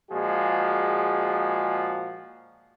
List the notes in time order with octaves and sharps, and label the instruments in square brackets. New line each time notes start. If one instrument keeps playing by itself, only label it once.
[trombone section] A#2 F3 G#3 F#4 G#4